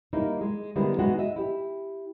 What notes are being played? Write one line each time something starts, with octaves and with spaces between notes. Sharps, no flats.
G3 A#3 D#4 E4
G#3
D3 G3 G#3 B3 E4 A#4
G#3 B3 D#4 E4 F#4
D#5 E5
E4 G4